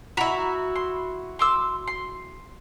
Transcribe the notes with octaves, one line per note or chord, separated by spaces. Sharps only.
E4 F#4 A#5 B5
C6
C6 D6 E6
C6